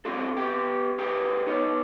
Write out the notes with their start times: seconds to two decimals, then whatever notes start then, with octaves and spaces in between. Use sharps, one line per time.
0.05 C4 D4 F4 F#4 A4
0.37 B3 G4 G5
0.99 G4 G#4 A#4 B4 G5
1.46 B3 D#4 C#5